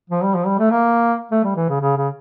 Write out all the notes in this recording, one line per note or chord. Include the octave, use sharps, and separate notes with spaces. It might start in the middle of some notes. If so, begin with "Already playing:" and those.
F3
G3
F3
G3
A3
A#3
A3
G3
E3
C#3
C#3
C#3